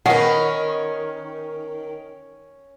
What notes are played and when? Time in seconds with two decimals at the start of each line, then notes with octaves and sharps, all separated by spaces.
0.06 D#3 C#4 A#4 B4 F#5